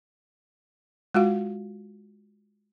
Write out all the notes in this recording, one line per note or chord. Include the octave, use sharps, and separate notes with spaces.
G#3 F4 F#4 F5